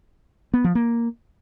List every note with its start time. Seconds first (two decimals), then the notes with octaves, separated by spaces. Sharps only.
0.54 B3
0.64 F3
0.75 A#3